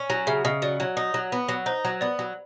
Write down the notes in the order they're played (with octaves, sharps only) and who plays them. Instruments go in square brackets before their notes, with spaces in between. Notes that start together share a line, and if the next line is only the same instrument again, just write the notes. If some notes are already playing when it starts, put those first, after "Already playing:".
Already playing: [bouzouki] C#4
F#3
[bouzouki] C#3 [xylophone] E5
[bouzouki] C#3 [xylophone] D#5
[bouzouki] F#3 [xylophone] D5
[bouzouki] F#3 [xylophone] C#5
[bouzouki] D#4
F#3
B3
F#3
[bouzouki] D#4 [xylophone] C5
[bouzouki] F#3
[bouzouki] B3 [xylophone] D5
[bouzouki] F#3